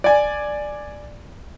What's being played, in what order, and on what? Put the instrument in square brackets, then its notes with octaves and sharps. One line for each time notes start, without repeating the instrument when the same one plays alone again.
[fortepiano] D5 G#5